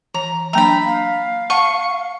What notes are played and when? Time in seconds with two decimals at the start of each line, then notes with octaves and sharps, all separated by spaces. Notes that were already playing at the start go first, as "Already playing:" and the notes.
0.14 E3 A#5
0.53 F#3 A#3 D4 A#5 B5
0.85 F5
1.50 F#5 A5 C#6